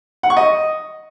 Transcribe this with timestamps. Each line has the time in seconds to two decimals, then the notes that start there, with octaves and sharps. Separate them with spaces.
0.23 F#5
0.30 C#6
0.37 D#5